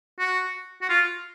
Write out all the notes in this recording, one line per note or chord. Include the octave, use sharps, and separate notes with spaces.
F#4
F#4
F4